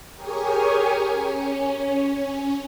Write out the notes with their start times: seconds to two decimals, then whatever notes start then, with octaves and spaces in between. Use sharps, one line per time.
0.15 G4 G#4 A#4 C#5 G#5
1.10 C#4